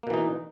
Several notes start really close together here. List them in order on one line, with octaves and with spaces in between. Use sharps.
A#3 B2 E3 D#4